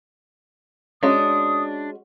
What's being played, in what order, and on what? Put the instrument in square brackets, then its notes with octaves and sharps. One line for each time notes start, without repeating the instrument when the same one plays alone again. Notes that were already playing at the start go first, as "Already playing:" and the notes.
[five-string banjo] G#3 C#4 F#4 [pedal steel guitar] D4 [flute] D#6